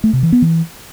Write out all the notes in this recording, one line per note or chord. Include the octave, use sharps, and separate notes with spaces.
A3
C3
E3
B3
E3